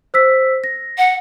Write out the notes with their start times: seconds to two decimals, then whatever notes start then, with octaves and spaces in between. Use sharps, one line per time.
0.14 C5 E6 B6
0.64 A#6
0.98 F#5